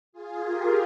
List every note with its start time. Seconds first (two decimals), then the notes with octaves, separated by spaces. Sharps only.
0.12 F4 G#4
0.42 G4 A#4